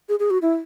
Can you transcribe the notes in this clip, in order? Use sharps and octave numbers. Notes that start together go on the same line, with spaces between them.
G#4
G#4
F#4
E4